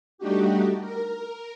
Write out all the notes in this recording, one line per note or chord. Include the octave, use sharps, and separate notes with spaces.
G3 A3 D4 D#4 F#4 G4
A#4